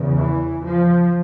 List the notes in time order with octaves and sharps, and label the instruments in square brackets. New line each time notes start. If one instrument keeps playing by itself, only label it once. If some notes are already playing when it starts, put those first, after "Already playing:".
Already playing: [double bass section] E2 C#3
E3
F3